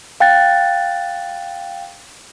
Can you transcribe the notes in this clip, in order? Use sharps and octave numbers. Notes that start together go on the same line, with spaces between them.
F5 G5 F#6 A6